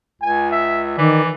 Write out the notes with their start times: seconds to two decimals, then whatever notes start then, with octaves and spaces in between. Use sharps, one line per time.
0.21 C#2 G#5
0.51 E5
0.98 D#3 E3 D5